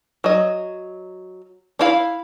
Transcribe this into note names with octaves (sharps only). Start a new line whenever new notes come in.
F#3 D#5
D4 E4 F5 B5